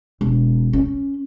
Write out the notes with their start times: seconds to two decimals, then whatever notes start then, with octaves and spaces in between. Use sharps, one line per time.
0.21 E1
0.73 C#4